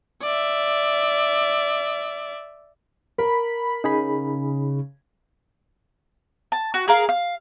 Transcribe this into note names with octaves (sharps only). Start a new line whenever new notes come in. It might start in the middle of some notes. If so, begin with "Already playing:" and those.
D5 E5
A#4 B5
C#3 D#4 G#4 B5
A5
F#4
G#4 A#4 F5
F5